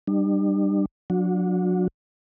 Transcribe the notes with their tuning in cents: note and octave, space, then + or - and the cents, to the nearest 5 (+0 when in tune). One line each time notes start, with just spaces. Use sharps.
G3 +0 D4 +40
F#3 -25 D4 +0 F#4 -30